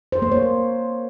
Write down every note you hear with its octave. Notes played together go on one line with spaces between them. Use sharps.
C5
A#3
C#5